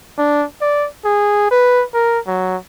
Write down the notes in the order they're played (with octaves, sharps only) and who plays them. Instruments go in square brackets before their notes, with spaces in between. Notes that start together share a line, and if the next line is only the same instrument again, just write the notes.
[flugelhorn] D4
D5
G#4
B4
A#4
F#3